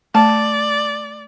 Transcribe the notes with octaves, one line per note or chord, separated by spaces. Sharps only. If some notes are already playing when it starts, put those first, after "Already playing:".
A3 D5 A5